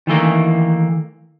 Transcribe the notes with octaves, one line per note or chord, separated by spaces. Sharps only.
D#3 E3 A3 A#3